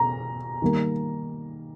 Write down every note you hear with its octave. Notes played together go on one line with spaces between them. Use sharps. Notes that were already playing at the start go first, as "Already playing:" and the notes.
Already playing: B2 A#5
D#3 G3 A#3